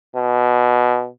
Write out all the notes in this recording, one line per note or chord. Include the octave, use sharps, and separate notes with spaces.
B2